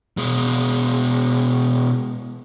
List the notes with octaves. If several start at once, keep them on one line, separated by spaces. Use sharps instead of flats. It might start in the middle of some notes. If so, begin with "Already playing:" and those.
B2 G#3